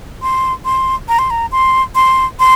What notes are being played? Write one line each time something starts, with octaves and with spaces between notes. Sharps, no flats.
C6
C6
A#5
C6
A#5
C6
C6
C6